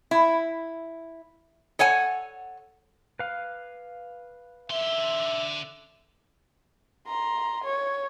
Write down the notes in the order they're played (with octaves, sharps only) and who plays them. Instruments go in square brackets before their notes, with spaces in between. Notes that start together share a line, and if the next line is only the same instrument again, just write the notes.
[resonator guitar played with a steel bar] E4
A4 C#5 F#5 G#5
[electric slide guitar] B4 F5
[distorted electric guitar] D3 C6 [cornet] E5
[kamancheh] A#5 C6
C#5